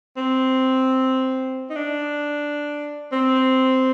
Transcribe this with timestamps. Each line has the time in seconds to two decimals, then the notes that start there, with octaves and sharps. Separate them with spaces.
0.17 C4
1.70 D#4
1.76 D4
3.12 C4